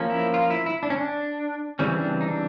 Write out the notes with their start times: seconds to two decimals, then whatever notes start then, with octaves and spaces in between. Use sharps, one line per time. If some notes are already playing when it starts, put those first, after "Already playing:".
Already playing: F3 A#3 C#4
0.10 E4
0.34 F4
0.50 E4
0.66 E4
0.83 D4
0.90 C#4
0.98 D4
1.79 C#3 E3 G3 C4 C#4
1.96 D4
2.21 D#4
2.28 D4